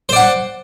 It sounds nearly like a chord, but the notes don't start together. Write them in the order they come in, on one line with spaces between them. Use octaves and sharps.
C5 D5 F#5